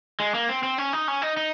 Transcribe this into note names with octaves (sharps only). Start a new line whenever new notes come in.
G#3
A#3
C4
C4
C#4
D#4
C#4
D#4
D#4